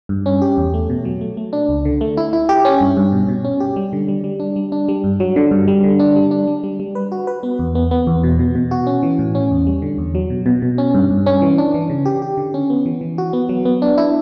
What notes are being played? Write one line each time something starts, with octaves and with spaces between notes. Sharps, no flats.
G2
C#4
G4
E2
A3
B2
F#3
A3
A3
D4
C#2
D3
A3
E4
E4
G4
C#4
G2
G2
B2
B2
C#4
G4
G3
D3
G3
G3
D4
G3
D4
G3
G2
F#3
D3
G2
G3
D3
D4
G3
D4
G3
G3
G3
B4
F#4
B4
B3
E2
B3
B3
E2
B2
B2
B2
F#4
C#4
E3
A2
C#4
E2
G3
D3
E2
F#3
B2
B2
B2
C#4
G2
G2
C#4
E3
D4
E3
C#3
G4
G4
D3
C#4
B3
E3
E3
F#4
B3
F#3
B3
D4
E4